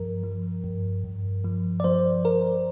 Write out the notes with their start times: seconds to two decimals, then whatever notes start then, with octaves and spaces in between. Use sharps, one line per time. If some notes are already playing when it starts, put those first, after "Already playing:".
Already playing: G2 F3 A#4
0.23 F3
0.64 G2
1.04 G2
1.44 F3
1.80 D5
1.84 F3 C5
2.25 A#4